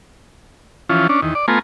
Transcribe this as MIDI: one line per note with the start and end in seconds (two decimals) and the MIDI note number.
0.89 1.07 52
0.89 1.07 53
0.89 1.07 61
0.89 1.07 65
1.09 1.21 61
1.09 1.21 62
1.22 1.34 40
1.22 1.34 51
1.35 1.46 74
1.48 1.59 57
1.48 1.59 59
1.48 1.59 65
1.48 1.59 80
1.48 1.59 82
1.48 1.59 84